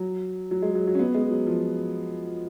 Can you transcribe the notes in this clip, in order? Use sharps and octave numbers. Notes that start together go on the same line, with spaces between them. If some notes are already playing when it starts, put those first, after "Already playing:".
Already playing: F#3
F#3
G#3
F#3
F#3
C#4
B3
G#3
F#3
F3